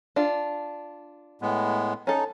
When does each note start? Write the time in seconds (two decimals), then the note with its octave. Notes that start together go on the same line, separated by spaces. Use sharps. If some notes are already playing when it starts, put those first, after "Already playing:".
0.16 D4 F4
1.42 A2 G#3 B3
2.07 C#4 D#4 A4